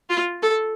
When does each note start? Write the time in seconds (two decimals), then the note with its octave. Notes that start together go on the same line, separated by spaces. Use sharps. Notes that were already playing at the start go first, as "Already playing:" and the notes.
0.10 F4
0.42 A4